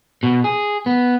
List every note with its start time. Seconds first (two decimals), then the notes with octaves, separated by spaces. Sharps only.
0.23 B2
0.44 G#4
0.86 B3